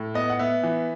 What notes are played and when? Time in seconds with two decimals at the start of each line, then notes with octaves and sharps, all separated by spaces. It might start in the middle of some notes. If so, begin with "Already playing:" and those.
Already playing: A2
0.14 B3 D#5
0.30 F#5
0.39 B3 E5
0.63 E3